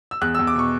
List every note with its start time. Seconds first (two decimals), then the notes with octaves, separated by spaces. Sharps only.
0.11 E6
0.21 E2 F#6
0.35 E2 E6
0.47 D6
0.56 B2 C#6